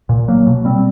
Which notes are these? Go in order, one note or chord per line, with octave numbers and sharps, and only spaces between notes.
A#2
F#3 A#3
B2
G3 C4